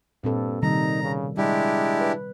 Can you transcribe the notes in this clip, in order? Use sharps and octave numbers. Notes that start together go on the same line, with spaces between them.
G2 A#2 C4 A4
C3 D#3 G3 D#4 A#5
C#3
G3 G#3 D4 E4 G4
B4